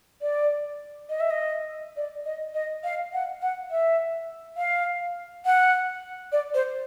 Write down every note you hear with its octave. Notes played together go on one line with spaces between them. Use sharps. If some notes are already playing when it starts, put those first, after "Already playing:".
D5
D#5
E5
D#5
D5
D#5
D#5
F5
F#5
F#5
E5
F5
F#5
D5
C5